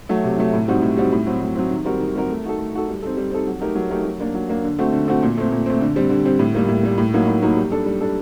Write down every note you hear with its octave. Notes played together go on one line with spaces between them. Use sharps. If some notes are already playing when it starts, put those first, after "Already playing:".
F#3 A3
C3
F#3 A3
A2
G3 C4 D#4 F#4
A2
G3 C4 D#4 F#4
A2
F#3 C4
A2
F#3 C4
D#3
G3 C4 F#4 A#4
D#3
G3 C4 F#4 A#4
A3
D#4 F#4 A4
A3
D#4 F#4 A4
G3
C4 D#4 A4
G3
C4 D#4 A4
F#3
A3 D#4 G4 A#4
F#3
A3 D#4 G4 A#4
F#3
A#3 D4
F#3
A#3 D4
D3
A3 C4 F#4
D3
A3 C4 F#4
A#2
A3 C4
A#2
A3 C4
D3
G3 C4
D3
G3 C4
A2
G3 A#3
A2
G3 A#3
A2
F#3 A#3 D#4
A2
F#3 A#3 D#4
G3
D4 A4
G3
D4 A4